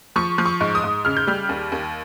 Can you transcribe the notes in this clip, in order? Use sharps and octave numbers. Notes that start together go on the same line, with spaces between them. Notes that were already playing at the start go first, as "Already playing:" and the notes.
F3 C#6
F3
C#6
G#2
D#6
G#2
C#3 F6
G6
G3 F6
D#2
D#2